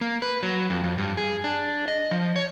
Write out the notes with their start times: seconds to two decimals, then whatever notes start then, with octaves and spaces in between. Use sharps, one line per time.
0.01 A#3
0.22 B4
0.43 F#3
0.70 F2
0.84 F2
0.98 G2
1.17 G#4
1.44 D4
1.88 D#5
2.11 F3
2.36 C#5